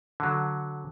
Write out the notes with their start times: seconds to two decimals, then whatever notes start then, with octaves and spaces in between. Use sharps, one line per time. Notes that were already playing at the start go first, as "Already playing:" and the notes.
0.20 D3 F#3